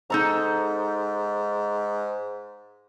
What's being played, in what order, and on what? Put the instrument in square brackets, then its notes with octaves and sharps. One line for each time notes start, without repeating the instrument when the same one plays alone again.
[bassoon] G#2 [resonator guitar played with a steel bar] D#4 A4 A#5